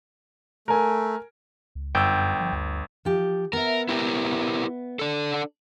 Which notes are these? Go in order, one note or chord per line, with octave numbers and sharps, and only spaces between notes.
A3 A#4 G#5
C#2
G1 F#2 G5 E6 G6
F3
D2
F3 G4
B3 A#4 E5
E4 G4 A#4
D4 A4